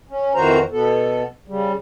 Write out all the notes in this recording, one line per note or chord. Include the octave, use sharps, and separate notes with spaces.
C#4
F2 D#3 E3 F#4 C5 A#5
B2 B3 A4
C#3 G3